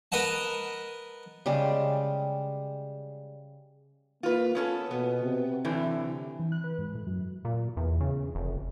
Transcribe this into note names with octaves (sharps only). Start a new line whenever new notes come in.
A#4 B4 D#5 F#5 A5
C#3 G3 G#3 G4
A#3 F4 B4
B3 C#4 F4 A4
B2 B3
C3
A2 D3 E3
E3
F#6
B4
G#2
A2
F#2
A#2
E2
C#3
F1